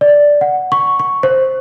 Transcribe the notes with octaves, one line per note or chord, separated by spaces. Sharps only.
D5
F#5
C#6
C#6
C5